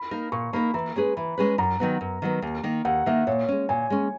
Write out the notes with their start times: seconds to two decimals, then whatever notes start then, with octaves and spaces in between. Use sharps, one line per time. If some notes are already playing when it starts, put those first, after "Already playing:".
Already playing: B5
0.11 A#3 D#4 A#4
0.32 A#2 C#6
0.53 A#3 D#4 A#4 B5
0.74 E3 A#5
0.96 G#3 C#4 G#4 B4
1.17 E3 B5
1.38 G#3 C#4 G#4 B4
1.58 F#2 A#5
1.80 D#3 F#3 B3
2.01 F#2
2.22 D#3 F#3 B3
2.42 D#2
2.63 D#3 A#3
2.85 D#2 F#5
3.06 D#3 A#3 E5
3.27 A#2 C#5
3.48 G#3 C#4
3.69 A#2 G#5
3.90 G#3 C#4